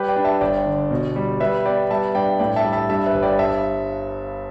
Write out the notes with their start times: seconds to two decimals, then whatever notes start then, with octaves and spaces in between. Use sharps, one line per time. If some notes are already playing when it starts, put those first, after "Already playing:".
Already playing: G3 G4 B4
0.08 D5 G5
0.16 D4
0.25 E5 A5
0.41 G1 D5 G5
0.66 D3
0.91 B2
1.16 G3
1.40 G3 B4 E5
1.65 B3 D5 G5
1.90 G3 E5 A5
2.15 G2 D5 G5
2.39 A2 D5 G5
2.56 E5 A5
2.65 G3
2.73 E5 A5
2.89 G2 E5 A5
3.06 B4 E5
3.14 G1
3.23 D5 G5
3.39 G2 E5 A5